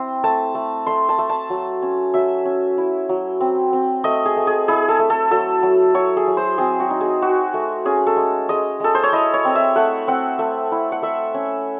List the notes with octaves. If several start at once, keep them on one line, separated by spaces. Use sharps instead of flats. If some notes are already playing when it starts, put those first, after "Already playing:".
Already playing: C4 E4 C6
A3 A5
A3
A3 C6
A5
A3
A5
F#3
C#4
F#3 E5
C#4
E4
F#3
C4
C4
A3 D#5
G#4
A3
G#4
E4 G#4
A4
A3
A4
F#3 A4
F#3
F#3 C#5
G#4
F#3
C5
C4 G#4
F#4
D#4
G#4
D#4 F#4
A3
C#4 G#4
A4
G#3
G#3 D#5
G#3 A4
C5
C#5
E4 D#5
C#5
C4
E5
A3 F#5
C4 F#5
A3
E4
F#5
A3 E5
C#4